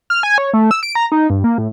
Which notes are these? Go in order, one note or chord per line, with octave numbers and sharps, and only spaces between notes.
F6
G#5
C#5
A3
E6
D7
A#5
D#4
G2
A#3
A2